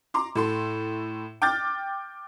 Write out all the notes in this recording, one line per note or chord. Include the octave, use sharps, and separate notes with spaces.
A#5 C6 D6
A2 A4 C6
G5 D6 F6 G6 A6